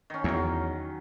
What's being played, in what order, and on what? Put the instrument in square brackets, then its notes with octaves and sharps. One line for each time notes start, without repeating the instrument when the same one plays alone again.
[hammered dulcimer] D#3 C#4
[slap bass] E2 [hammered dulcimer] D#3 F#3